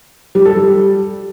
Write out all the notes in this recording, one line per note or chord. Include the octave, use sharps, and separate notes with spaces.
G3
A4
G3